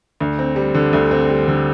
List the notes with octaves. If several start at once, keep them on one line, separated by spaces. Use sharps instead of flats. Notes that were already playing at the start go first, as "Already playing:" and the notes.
D2
C4
G3
D3
D2
C4
G3
D3